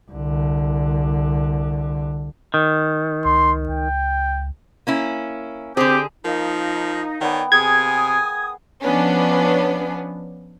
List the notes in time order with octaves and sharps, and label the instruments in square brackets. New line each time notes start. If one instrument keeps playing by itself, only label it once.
[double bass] C2 D3
[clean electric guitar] D#3
[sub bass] C#2 [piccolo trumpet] C6
[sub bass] C#2 [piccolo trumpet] G5
[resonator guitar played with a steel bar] A#3 C#4 E4
[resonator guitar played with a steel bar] D3 G#4 [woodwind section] C4 G4
[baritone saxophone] F3 [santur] A#3 [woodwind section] D#4
[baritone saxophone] D#3 [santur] B3 G5 [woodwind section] C#5 D5 G#5
[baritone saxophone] C3 [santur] G#4 [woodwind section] G#5 D#6 [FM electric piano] G#6
[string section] F3 B3 C#4 D4